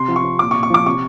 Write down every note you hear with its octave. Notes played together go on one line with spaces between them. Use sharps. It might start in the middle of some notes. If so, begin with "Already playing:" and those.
Already playing: C3 C6
F3
C#6
C3
A#2 D6
C#6
A#2
C#6
F3 D6
C3 C#6